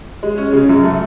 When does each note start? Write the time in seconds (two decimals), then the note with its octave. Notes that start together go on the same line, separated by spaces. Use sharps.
0.23 G#3
0.38 C#4
0.53 C#3
0.69 F#2
0.83 A3